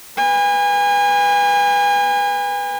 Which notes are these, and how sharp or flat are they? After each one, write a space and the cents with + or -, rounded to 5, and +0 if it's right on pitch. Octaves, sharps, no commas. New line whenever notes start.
B4 +0 G#5 -35